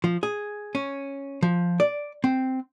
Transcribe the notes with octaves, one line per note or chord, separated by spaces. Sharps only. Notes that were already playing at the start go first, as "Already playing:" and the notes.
F3
G#4
C#4
F3
D5
C4